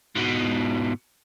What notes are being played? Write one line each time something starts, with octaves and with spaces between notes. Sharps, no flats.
G#2 B2